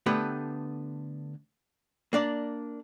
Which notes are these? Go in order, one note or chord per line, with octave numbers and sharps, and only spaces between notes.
D3 A3 B3 G4 A4 B4
A#3 D4 D5